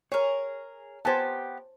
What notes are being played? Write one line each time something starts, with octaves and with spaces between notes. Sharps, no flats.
G#4 A#4 C#5
B3 G4 C5 G#5 A5